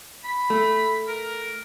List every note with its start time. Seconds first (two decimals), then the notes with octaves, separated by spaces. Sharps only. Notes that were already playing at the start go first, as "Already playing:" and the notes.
0.24 B5
0.50 A3
1.08 A#4